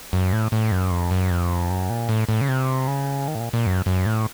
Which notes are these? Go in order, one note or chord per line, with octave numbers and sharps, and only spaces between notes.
F#2
A2
A2
F#2
F2
F#2
F2
F#2
A#2
A2
A2
C#3
C3
C#3
D#3
A2
A#2
A#2
F#2
F#2
A2